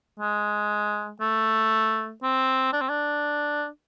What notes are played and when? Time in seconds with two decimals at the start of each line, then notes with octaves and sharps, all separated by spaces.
0.20 G#3
1.21 A3
2.23 C4
2.73 D4
2.81 C4
2.89 D4